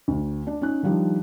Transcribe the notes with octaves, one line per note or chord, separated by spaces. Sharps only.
D2
D4
C#4 D#4 F#6
D#3 F3 G3 D4 D#4